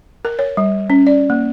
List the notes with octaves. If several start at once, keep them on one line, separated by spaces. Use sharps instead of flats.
A#4
C#5
G3
C#4
D5
A#3